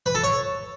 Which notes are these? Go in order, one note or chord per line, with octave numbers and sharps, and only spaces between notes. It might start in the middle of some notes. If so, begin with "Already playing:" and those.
B4
A4
C#5